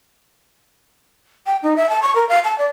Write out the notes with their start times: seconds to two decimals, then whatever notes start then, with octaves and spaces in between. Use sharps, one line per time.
1.46 G5
1.63 D#4
1.76 E5
1.89 A5
2.02 C#6
2.15 A#4
2.29 F5
2.44 A5
2.58 D5